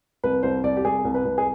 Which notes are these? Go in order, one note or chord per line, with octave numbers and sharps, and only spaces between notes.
C2 B4
C2 C5
C2 D5
G4
C2 G#4
C2
B4
C2
G#4